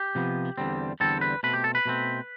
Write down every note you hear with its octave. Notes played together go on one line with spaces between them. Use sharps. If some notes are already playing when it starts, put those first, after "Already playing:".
Already playing: G4
C3 F3 B3
E2 D3 G3 C4
E2 D3 G3 C4 A4
B4
B2 A3 C4 B4
G4
A4
B4
B2 A3 C4